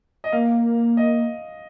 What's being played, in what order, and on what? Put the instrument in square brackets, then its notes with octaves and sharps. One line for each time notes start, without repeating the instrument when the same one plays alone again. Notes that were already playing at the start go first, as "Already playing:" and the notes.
[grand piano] D#5
[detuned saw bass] A#3 [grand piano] F5
[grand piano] D#5